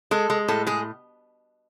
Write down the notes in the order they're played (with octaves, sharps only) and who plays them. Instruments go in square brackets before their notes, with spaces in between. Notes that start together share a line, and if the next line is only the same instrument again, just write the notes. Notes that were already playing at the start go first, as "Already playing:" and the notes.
[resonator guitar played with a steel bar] G#3 A4
G#3
A2 A4
G#3 G#4